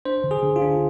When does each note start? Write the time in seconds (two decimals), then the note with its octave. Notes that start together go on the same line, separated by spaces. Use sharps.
0.05 D4 C5
0.24 D3
0.31 G#4
0.43 D3
0.56 F4
0.62 D4